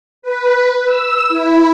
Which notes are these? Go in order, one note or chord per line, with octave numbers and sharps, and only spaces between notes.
B4
E6
E4